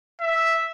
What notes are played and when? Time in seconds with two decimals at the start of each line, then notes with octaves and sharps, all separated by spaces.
0.21 E5